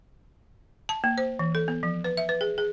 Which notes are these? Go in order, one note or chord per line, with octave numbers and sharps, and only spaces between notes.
A5
A#3
C5
E3
A4
B3
F3
B4
E5
B4
G#4
G#4